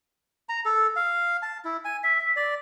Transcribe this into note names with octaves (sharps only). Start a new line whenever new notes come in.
A#5
A4
F5
A5
E4
G#5
E5
E5
D5